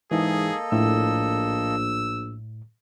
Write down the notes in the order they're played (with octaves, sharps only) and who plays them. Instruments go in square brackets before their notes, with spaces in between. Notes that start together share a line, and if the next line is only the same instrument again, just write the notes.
[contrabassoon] G#2 [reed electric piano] E3 [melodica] A#3 A4 D#5 [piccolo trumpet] G#4
[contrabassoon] A#1 [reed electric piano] A2 [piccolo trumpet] E6